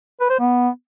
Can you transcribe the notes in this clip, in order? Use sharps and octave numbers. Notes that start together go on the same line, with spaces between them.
B4
C5
B3